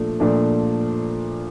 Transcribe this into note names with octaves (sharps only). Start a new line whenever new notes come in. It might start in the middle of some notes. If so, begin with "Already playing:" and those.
Already playing: A#2 F3 A3 D4
A#2 F3 A3 D4